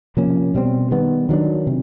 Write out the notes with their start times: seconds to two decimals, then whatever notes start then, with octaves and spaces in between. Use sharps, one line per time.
0.17 C3 F3 A#3 C#4
0.54 B2 G3 C4
0.91 D#3 G3 B3
1.29 D#3 F#3 B3 D4
1.67 C3